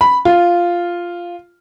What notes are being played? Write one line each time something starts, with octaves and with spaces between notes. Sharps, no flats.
B5
F4